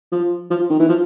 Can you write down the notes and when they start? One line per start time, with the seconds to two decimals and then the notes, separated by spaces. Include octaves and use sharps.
0.12 F3
0.50 F3
0.70 D#3
0.79 E3
0.88 F3